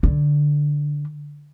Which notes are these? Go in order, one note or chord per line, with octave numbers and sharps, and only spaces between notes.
D3